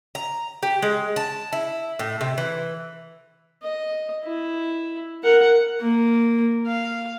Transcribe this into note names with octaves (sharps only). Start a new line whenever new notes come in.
A#5
G4
G#3
A5
E4
A2
C3
E3
D#5
E4
A#4 F#5
A#3
F5